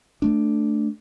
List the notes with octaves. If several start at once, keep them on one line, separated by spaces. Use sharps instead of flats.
A3 D4